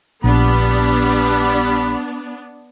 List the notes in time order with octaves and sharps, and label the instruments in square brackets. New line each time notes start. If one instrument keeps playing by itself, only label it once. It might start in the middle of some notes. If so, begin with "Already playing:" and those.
[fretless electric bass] A#1 [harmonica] G3 B5 [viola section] B3 D4